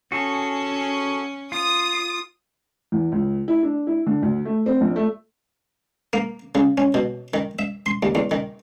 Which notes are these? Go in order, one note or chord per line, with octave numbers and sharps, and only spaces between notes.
C#4 F#4 G#4 A4
F4 D#6
E2
C#2
E4
D4
E4
D3
D2
A3
C4
A#1
A3
A#3
C#3
C#4
B2
D#3
E5
C6
D#2
E2
D#3